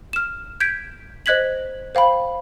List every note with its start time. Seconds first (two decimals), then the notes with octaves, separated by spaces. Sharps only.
0.13 F6 E7
0.60 G6 G#6 B6 D7
1.26 C5 D#5 F#6 G#6 B6 F#7
1.95 C5 F5 G5 B5